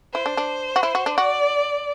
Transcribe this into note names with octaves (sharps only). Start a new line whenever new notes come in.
E4 C5
D4
D4
F#4
E4
F#4
D4
F#4 D5